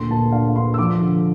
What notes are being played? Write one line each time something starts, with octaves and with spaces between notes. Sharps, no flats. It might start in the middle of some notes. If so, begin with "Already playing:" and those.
Already playing: D2 A#2 C6
A#2 A5
D4 F5
D4 C6
E6
F3 D6
D3